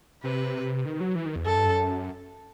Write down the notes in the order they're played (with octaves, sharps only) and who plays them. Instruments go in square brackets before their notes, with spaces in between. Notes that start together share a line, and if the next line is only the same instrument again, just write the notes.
[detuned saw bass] C3 [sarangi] B4
[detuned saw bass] D#3
F#3
E3
D#3
E2
[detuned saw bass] F#2 [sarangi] A4
[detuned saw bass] G2
F#2